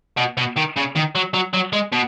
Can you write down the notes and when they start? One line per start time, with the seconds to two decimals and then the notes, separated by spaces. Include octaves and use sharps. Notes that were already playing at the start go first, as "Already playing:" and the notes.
0.17 B2
0.37 B2
0.56 D#3
0.76 C#3
0.95 D#3
1.15 F#3
1.34 F#3
1.53 F#3
1.73 G#3
1.93 B2